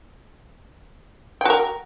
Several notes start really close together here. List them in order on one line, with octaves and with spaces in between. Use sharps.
G5 F#4 A#4